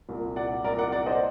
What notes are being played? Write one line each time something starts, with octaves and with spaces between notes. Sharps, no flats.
C2 A#2
D5 F#5
C2 A#2 A#4 D5
D5 F#5
D5 F#5
C5 D#5